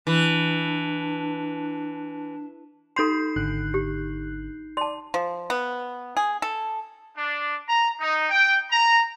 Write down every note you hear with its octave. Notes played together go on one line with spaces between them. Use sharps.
E3 D4
D#4 A4 C6 G6 C7
G#1 D3 F#6
G4
D5 A5 C6
F3
B3
G#4
A4
D4
A#5
D#4
G5
A#5